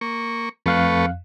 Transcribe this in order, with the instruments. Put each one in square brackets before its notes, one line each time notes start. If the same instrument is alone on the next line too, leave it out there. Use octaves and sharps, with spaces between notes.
[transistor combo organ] A#3 C#6
[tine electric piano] F2 F5 F#6 [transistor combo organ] A3 B4 C#6